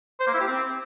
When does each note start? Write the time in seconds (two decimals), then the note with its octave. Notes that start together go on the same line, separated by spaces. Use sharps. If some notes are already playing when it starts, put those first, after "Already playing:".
0.20 C5
0.27 A#3
0.34 E4
0.40 G4
0.47 C4